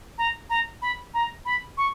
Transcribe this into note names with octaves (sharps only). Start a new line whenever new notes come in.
A#5
A#5
B5
A#5
B5
C#6